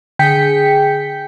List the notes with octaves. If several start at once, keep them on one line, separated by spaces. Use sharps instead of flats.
D3 G#4 G5 G6 B6 C#7